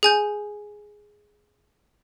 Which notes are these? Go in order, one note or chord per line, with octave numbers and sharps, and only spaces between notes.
G#4 G#5 G6